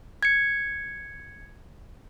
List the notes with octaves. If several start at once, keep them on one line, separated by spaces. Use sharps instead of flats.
G#6 C#7